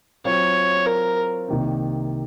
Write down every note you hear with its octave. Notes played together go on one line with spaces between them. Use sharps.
F#3 C4 F4 C5 C#5
A#4
C2 C3 D#3 A#3 D#4